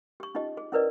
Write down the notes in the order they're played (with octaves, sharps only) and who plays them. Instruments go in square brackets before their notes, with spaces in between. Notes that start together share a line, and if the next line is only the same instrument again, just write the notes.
[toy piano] G4 C#6
C#4 D#4 F4 G4 D#5
G#4
C#4 E4 A#4 B4 D5 D#5